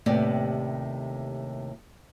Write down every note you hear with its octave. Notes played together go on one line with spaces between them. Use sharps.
D#2 A2 C3 B3 G4 D5